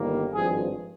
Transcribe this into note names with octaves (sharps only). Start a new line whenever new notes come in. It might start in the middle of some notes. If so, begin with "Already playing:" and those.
Already playing: G1 D#3 G3 A#3
G#1 G2 F3 G#4